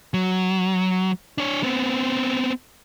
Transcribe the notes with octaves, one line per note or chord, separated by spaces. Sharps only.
F#3
D4 C#5
B3 C4